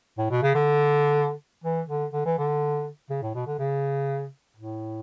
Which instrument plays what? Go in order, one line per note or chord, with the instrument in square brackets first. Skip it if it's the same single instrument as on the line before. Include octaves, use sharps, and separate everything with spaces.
[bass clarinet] A2
B2
C#3
D3
E3
D3
D3
E3
D3
C#3
A2
B2
D3
C#3
A2